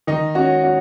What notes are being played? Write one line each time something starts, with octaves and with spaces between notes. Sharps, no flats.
D#3 D#4
C#4 F#4
C#4 F#4